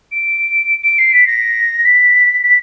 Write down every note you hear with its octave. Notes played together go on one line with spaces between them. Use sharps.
D7
D7
C7
B6
A#6
B6
B6